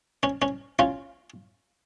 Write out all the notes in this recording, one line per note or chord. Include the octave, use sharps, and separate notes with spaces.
C#4
C#4
C#4 F4